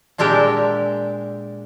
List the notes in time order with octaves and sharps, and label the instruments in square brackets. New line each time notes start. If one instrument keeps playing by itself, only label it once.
[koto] A#2 G#3 D4 G4 A#4 E5